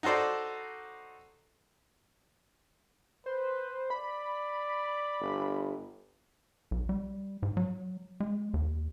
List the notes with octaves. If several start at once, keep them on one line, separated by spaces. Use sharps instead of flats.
D#4 F#4 A4 C5 D5
B4 C5
D5 B5
G1
B1
G3
G#2
F#3
G#3
D#2